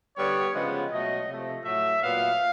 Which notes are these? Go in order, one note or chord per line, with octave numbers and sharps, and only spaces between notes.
D3 G3 B3 C#5
C#3 F3 G#3 B3
B2 F#3 A3 D#5
C3 F3 A3
A2 F#3 A3 E5
A#2 F#3 B3 F5